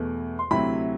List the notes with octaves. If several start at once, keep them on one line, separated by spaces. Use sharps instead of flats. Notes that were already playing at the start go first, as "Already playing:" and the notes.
Already playing: E2 B2 A3
C6
D2 C3 F#3 C4 E4 B5